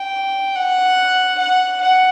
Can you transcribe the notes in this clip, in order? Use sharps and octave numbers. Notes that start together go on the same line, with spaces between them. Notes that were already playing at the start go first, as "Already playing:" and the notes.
Already playing: G5
F#5
F#5
F#5